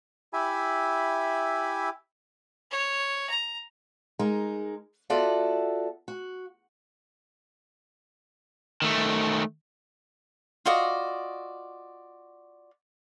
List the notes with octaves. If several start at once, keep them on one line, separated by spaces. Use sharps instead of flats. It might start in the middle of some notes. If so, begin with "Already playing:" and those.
E4 G4 E5 G#5 B5
C#5
A#5
G#3 D#4 A#4
B3 F4 F#4 A4 D5 E5
F#4
D#3 A3
F4 F#4 D5 D#5